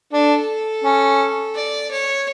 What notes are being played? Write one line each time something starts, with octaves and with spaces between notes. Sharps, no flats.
D4 A4
C#4
D5
C#5